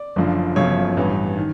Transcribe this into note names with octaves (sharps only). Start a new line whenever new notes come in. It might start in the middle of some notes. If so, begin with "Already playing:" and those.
Already playing: D5
F#1 F#2 D3 F3
G1 F#2 C#3 F3 C#5
A1 G2 E3
D#3